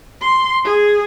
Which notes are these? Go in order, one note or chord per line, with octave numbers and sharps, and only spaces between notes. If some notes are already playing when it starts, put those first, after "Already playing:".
C6
G#4